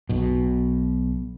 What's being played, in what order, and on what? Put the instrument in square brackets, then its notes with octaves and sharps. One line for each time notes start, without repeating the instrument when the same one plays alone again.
[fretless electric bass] B1 B2